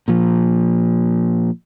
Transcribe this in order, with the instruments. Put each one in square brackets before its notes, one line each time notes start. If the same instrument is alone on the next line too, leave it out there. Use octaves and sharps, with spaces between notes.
[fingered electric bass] A#2 F3